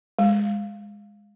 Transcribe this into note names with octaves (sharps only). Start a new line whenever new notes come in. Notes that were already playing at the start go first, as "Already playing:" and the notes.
G#3